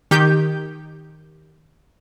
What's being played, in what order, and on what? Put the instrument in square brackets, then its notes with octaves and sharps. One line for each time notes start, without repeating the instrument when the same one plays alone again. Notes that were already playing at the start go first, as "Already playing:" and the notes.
[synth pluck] D#3 G4 G6